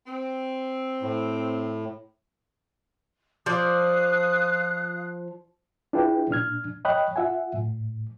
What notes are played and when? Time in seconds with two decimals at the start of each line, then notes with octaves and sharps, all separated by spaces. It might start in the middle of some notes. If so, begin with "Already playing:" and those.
0.06 C4
1.02 A2
3.46 F3 D5 F5 D#6 F#6
5.93 D4 E4 F4 G#4 B4 G5
6.30 A#2 D4 F6 G#6
6.85 C#5 D#5 G5 B5 F#6
7.16 F4 E5 F#5 G#5
7.54 A2